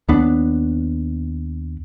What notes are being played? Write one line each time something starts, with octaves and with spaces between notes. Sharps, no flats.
D#2 B3 D4